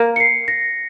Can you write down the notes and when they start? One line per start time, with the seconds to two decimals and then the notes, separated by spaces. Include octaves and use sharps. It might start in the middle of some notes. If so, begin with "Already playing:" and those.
Already playing: A#3
0.16 C#7
0.20 C7
0.48 A#6